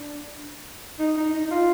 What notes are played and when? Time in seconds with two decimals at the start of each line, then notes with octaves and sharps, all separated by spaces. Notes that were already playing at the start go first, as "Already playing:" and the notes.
Already playing: D4
1.00 D#4
1.17 D#4
1.34 D#4
1.45 D#4
1.51 F4